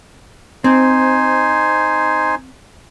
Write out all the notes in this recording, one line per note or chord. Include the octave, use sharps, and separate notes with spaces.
C4 D#4 C5 G#5